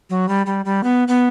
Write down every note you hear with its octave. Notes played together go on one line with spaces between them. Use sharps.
F#3
G3
G3
G3
B3
B3